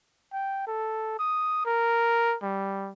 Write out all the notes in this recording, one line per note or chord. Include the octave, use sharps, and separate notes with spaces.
G5
A4
D#6
A#4
G3